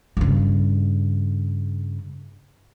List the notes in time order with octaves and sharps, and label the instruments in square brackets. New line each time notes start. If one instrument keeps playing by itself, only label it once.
[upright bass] G2 C#3